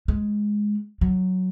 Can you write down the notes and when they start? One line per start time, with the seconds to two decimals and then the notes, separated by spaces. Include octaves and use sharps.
0.08 G#3
1.01 F#3